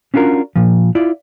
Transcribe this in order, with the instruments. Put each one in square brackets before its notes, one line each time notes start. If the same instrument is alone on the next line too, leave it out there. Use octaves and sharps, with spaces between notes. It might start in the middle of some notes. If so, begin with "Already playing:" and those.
[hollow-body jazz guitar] C#4 D4 F4 F#4 A#4
A#2 F3
E4 F4 D5